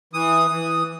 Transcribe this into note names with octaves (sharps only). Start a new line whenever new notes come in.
E3 D#6
E3